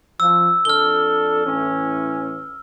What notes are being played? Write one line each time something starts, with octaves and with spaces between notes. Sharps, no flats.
F3 E6
F2 D4 A4 F6 G7
A2 E3 C#4